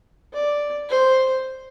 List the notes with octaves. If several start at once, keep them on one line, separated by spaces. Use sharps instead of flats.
D5
C5